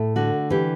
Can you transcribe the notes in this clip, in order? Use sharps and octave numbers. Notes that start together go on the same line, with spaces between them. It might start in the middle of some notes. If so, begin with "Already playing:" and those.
Already playing: A2 A3
D3 F#4
E3 G4